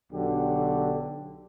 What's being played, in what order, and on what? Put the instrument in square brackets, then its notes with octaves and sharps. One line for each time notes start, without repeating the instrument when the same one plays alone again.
[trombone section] B1 D3 F#3 G4